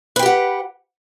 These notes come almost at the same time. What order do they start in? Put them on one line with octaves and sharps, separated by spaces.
B4 G5 G4 F#5